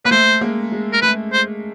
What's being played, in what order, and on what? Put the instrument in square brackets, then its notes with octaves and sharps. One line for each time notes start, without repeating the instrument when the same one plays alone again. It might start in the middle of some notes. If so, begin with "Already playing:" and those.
[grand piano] A#3 [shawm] B4
[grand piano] A3 [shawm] C5
[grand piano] G#3 A#3
G#3
[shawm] A#4
[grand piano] A3 [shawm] B4
[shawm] C5